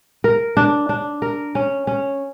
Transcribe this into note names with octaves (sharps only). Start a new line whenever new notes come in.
A#4
D4
D4
A#4
C#4
C#4